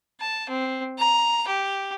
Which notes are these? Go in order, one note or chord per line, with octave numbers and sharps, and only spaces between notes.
A5
C4
A#5
G4